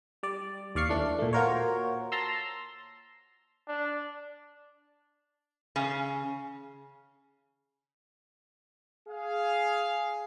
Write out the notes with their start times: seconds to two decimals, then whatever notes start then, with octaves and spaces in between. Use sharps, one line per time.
0.23 G3 D5
0.75 D#2 D5 F5 C#6 C7
0.89 E3 A3 D4
1.19 A#2 A3
1.33 A#3 F4 F#4 A#4 C5 C#5
2.12 A5 A#5 C6 E6
3.68 D4
5.76 C#3
9.09 G#4 F5